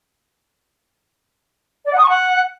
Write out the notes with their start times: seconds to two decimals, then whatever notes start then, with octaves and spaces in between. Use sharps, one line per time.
1.87 D5
1.92 F#5
1.97 D#6
2.03 C#6
2.08 F#5